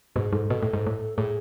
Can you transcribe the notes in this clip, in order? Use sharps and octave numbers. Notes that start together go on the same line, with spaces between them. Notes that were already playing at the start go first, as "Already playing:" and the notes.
G#2 B2 G#4
G#2 A4
B2
A2
G#2
A2
A2 G#4